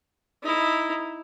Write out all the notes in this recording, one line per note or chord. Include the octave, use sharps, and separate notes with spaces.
D#4 E4